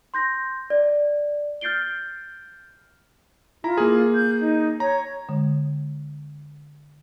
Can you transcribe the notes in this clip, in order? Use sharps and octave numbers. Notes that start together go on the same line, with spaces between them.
C6 G6 A#6
D5
F6 G6 A6 C7 D7 G7
E4 F4 A#5
A#3 G#4
G6
D#4
C#5 A#5
D3 G#3